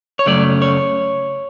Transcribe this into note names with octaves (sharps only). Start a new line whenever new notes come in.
C#5
F#2 C#3 F#3 A3 C#4 D5
C#5